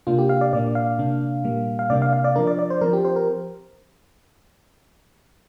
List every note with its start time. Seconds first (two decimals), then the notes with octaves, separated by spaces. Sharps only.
0.07 C3 A#3 D4 F4
0.18 G4
0.29 F5
0.41 D5
0.53 A#2 A#3 D4 D5
0.75 F5
0.99 C3 A#3 D4
1.44 A#2 G3 A#3
1.79 F5
1.90 C3 A#3 D4 D5
2.02 F5
2.13 F5
2.24 D5
2.36 F3 D4 A#4
2.47 D5
2.59 D5
2.70 C5
2.81 F3 C4 A#4
2.93 G4
3.05 C5
3.16 A#4